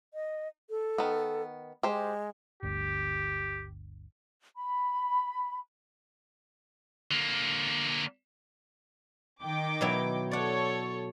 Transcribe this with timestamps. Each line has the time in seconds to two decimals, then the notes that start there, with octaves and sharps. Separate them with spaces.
0.14 D#5
0.70 A4
0.98 D#3 B3
1.83 G#3 G4 C5
2.63 G1 D2 G4
4.55 B5
7.11 D3 A#3
9.42 D#3 G5 D6
9.81 B2 F#3 E4
10.31 A4 C#5 D5 F#5